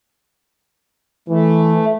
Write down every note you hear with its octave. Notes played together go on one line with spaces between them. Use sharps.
E3 A3